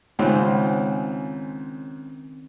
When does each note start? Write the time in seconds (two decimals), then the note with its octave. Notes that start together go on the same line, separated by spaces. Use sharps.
0.19 C#2 G#2 D#3 C4 C#4